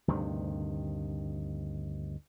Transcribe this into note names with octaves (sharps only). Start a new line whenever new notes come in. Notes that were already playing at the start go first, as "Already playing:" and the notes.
D2 G2 C3 D#3